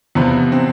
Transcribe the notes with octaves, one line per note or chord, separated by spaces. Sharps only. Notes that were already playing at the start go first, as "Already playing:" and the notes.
E2 C3 F3 B3
C4